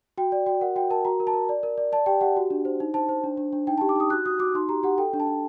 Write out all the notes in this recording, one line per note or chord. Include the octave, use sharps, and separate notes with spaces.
F#4 G5
D5
F#4 G5
A#4 F#5
F#4 G5
A#4 A5
F#4 A#5
A#4
A5
A#4
D5
A#4
D5
D5 A5
G4 G5
G4 F#5
F#4
D4
C5
D#4
C5 A5
C5
D4
D4
D4
D#4 G5
A5
G4
D6
D#4 D#6
F#4 F#6
F#4 D#6
F#4 D6
D#4 C6
G4 A#5
G4 F#5
A4 G5
D4
A5
D4